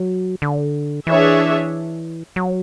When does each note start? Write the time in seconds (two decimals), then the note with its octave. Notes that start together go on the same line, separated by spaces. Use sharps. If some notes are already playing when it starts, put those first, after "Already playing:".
Already playing: F#3
0.42 D3
1.07 E3 D4 G#4 C#5 E5
2.36 F#3